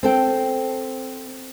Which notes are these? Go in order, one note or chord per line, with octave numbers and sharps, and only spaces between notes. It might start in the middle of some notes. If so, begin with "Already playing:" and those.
C4 A4 G5